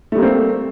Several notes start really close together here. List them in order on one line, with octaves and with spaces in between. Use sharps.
A3 G3 A#3 C4